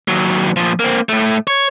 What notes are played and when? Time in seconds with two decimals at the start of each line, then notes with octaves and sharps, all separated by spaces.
0.08 D#2 F#3
0.56 A#2 F3
0.80 A#3 C4
1.09 A2 A3
1.47 C#5